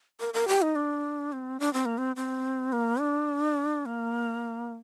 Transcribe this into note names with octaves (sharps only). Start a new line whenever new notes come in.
A#4
A#4
G4
D#4
D4
C4
D4
C4
A#3
C4
C4
A#3
D4
A#3